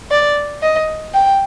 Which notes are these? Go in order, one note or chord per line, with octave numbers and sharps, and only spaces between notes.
D5
D#5
G5